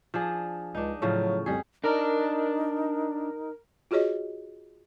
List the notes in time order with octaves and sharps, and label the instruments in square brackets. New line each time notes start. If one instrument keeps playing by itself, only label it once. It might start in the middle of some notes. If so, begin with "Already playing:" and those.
[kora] F3 D4 G#4
[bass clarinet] C#2 [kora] D4 D#4
[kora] A2 C#3 F3 [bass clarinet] F#3
[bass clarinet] F2 [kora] G3 G#4
[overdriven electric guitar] D4 D5 [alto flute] D#4 [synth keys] A#4
[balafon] F4 F#4 G#4 C#5 D#5